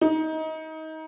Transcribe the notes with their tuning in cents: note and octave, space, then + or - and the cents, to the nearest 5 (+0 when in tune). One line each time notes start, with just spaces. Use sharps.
D#4 +25